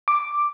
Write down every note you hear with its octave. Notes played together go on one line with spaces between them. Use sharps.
D6